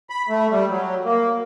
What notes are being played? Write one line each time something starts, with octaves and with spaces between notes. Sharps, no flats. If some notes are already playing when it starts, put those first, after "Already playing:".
B5
A3
G3
F#3
A#3